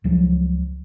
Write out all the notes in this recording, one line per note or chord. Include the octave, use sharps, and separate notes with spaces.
C#2 F3 F#3